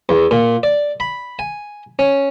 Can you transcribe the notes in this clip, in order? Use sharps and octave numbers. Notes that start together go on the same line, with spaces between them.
E2
A#2
D5
B5
G#5
C#4